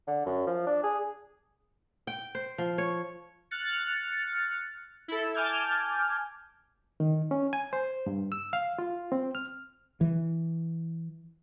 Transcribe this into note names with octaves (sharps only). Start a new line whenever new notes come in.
D3
F#2
F3
D4
G#4
G5
C5
F3
C#5
F6 F#6 A6 C#7
E4 A4
G#5 A5 D6 F6 G6 G#6
D#3
C#4
G#5
C5
G2
E6
F5
F4
C4
F6
E3